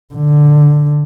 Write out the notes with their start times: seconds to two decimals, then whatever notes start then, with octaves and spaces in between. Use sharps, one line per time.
0.14 D3